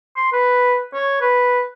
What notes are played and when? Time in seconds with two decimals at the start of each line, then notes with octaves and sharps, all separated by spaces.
0.16 C6
0.33 B4
0.94 C#5
1.21 B4